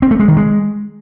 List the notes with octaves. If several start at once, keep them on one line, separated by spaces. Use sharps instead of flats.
C4
A3
G#3
D#3
G#3